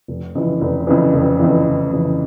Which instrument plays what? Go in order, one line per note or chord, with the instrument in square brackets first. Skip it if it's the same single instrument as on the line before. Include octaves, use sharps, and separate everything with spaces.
[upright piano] F1
F2 C#3 E3
F1
F2 C#3 E3
F1
F2 C#3 E3
F1
F2 C#3 E3